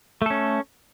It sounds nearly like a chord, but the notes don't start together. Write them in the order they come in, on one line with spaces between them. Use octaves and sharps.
A3 A4 C#4